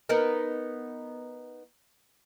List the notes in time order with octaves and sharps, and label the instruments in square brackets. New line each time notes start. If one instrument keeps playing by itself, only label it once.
[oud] B3 D#4 A#4